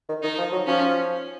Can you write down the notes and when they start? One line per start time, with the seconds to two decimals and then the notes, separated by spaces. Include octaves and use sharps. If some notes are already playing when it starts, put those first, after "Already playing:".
0.09 D#3
0.23 D#3 D#4
0.38 F3
0.52 F#3
0.67 F3 C#4